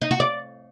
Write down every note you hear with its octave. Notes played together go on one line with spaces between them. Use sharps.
D#4
F#4
D5